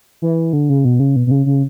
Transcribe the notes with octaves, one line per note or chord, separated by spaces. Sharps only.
E3
D3
C#3
B2
C#3
B2
B2
C#3
C#3